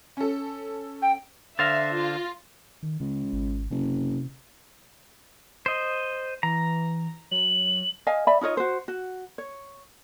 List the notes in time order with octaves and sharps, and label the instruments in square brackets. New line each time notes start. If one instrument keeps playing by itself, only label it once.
[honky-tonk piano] C#4 A4
[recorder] G5
[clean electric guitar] D3 C5 F5 [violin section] E5 [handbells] A6 A#6
[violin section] F4
[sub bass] D#3
[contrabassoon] C#2 [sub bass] C#3
[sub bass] G#1
[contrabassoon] F#1 [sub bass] C3
[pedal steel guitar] C5 D#5
[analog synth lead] E3 [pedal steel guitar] A#5
[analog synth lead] F#3 [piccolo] F#7
[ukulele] D#5 F5 G#5
D5 E5 B5
D#4 F4 C#5 D#5
F#4 C5
F#4
C#5